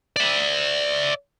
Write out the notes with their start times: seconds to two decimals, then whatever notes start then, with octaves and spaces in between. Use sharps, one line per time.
0.16 D5 E5